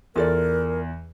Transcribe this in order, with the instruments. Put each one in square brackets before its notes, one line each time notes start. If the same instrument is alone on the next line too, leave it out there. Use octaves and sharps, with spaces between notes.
[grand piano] E2 [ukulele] F4 A4 D5 [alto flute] A#4